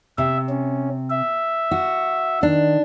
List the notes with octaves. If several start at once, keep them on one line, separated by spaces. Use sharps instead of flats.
C3 E5
C#4
E5
F#4
D#3 D4